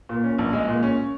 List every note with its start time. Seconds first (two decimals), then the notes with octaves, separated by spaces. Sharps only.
0.09 A#2
0.24 C#4
0.39 A#1
0.53 G#3
0.68 A#2
0.83 C#4